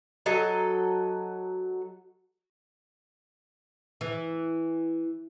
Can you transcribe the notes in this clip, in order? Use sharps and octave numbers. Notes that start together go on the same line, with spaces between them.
F#3 A4 D#5
E3